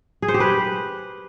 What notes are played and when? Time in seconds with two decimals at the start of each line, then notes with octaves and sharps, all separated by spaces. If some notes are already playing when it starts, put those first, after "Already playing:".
0.22 G#4
0.28 C5
0.34 G4
0.40 B4